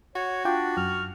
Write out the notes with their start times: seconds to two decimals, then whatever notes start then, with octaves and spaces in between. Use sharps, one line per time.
0.16 F#4 C#5
0.45 D4 F4 G5 D6
0.77 F#2 F6